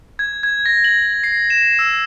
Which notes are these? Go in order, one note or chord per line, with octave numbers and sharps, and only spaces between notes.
G#6
G#6
A#6
F#7
C7
E7
E6